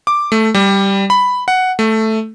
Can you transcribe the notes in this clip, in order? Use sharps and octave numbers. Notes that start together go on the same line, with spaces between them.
D6
A3
G3
B5
F#5
A3